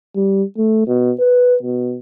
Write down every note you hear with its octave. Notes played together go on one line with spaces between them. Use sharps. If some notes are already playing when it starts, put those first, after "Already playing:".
G3
A3
B2
B4
B2